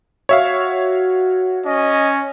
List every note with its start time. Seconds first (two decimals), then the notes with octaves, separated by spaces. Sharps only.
0.29 F#4 C#5 E5 F5
1.66 C#4 D#5